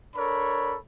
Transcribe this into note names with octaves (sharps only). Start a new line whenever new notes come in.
D4 A4 A#4 C#5 B5